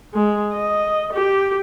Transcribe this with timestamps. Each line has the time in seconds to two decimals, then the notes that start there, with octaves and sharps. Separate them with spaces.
0.14 G#3
0.53 D#5
1.13 G4